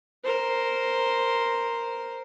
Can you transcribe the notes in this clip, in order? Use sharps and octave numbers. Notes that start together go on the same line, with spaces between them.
A#4 C5